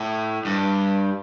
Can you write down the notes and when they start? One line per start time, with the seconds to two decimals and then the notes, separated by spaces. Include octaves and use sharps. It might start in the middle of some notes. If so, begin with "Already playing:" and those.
Already playing: A2
0.45 G2